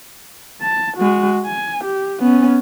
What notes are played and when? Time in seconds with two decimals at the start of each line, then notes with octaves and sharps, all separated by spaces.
0.61 A5
0.97 G#3 F#4
1.45 G#5
1.84 G4
2.20 B3 C#4